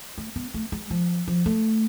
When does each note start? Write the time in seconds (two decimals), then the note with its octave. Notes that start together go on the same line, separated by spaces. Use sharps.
0.18 A3
0.36 B3
0.54 A3
0.72 G#3
0.90 F3
1.28 F3
1.46 A3